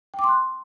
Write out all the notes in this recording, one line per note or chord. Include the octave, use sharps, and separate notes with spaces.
G5
D6
C6
F#6